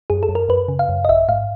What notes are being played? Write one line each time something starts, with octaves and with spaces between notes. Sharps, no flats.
F#2 G#4
A4
F#2
A#4
F#2 B4
C#3
F5
F#2
D#5
A1 E5
G#2 F5